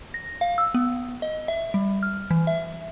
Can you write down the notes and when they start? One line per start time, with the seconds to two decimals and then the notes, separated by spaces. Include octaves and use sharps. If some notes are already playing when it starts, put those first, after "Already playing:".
0.14 A#6
0.41 F5
0.58 E6
0.74 B3
1.22 D#5
1.48 E5
1.74 G3
2.03 F6
2.31 E3
2.47 E5